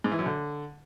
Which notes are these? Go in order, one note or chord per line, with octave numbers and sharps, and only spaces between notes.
G#2
E3
F#2
D3